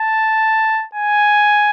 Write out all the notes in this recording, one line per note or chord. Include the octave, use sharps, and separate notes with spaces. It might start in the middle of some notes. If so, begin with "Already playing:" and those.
Already playing: A5
G#5